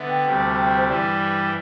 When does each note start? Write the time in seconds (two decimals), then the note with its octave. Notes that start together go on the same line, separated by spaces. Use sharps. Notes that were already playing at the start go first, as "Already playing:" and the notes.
Already playing: D3 B3 E5 F#5
0.09 G5
0.25 D2 C3 G3 G5
0.41 A5
0.57 G5
0.73 C5
0.88 G2 E3 G3 D5